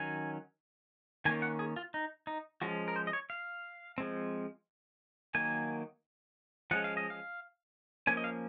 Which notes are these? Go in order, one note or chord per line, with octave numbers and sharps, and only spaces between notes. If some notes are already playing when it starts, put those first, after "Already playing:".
Already playing: D#3 F#3 C#4 G#5
D#3 A#3 C#4 G#5
F#5
G#4
F4
D#4
D#4
F3 G#3 C#4 F#4
A#4
C5
D#5
C#5
F5
F3 G#3 C4
D#3 F#3 A#3 G#5
F3 G#3 C#4 F#5
F5
D#5
F5
F3 A#3 C#4 G#5
D#5
F5